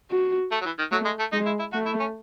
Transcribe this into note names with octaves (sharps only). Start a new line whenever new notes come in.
F#4
A3
F#3
E3
D#3
F#3 A3
G#3
A3
G#3 D#4
E4
E4
A3 F#4
E4
C#4